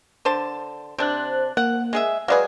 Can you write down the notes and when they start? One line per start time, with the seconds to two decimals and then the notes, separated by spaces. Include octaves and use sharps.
0.25 D3 C5 A5
0.98 C3 D4 C5 F#6
1.57 A#3 F#5
1.93 G#3 G#4 E5
2.28 F#3 G#3 G#4 B4 D5 F5